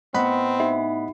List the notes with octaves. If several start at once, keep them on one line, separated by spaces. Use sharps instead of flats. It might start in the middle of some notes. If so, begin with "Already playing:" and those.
A2 B3 C4 D#5 F#5 B5
D#4 E5